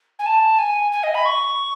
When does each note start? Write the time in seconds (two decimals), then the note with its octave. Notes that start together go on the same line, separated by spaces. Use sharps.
0.19 G#5
0.26 A5
0.58 G#5
0.92 G#5
1.03 D#5
1.15 B5
1.25 C#6